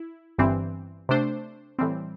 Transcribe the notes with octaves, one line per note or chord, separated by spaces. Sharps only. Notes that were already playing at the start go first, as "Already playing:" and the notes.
Already playing: E4
G1 G2 E3 C4
C3 A3 D4 C5
A2 E3 G3 C4